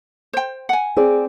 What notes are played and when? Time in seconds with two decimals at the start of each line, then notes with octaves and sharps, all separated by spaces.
0.33 C5 G5
0.69 F#5 G#5
0.97 C4 G#4 D5